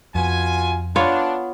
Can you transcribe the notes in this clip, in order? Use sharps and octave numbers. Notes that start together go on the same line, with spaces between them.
F2 B2 F4 G#5
B3 D4 F4 C#5